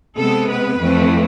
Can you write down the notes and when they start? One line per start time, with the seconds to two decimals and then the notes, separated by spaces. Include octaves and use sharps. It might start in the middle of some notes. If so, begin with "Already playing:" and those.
0.17 C3 G#3 B3 A4
0.49 B4
0.79 F2 E3 A3 C4